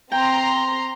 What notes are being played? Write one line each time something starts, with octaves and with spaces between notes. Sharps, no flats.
C4 G5 A#5 C6